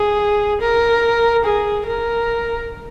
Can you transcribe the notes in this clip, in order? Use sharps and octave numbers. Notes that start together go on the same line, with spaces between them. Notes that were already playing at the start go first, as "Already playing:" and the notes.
Already playing: G#4
A#4
G#4
A#4